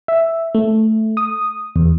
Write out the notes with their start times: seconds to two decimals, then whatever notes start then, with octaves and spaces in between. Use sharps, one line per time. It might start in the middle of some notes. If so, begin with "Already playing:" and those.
0.08 E5
0.55 A3
1.17 D#6
1.76 E2